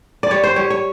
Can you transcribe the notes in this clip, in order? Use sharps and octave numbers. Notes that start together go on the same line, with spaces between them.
D5
G3 C#5
C5
G3 C#5
C#5